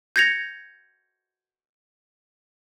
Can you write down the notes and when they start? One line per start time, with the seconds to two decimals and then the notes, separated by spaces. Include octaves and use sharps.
0.16 G6 G#6 A#6 C#7 F7